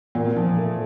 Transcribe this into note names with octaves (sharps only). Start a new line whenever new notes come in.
A#2
F3
A3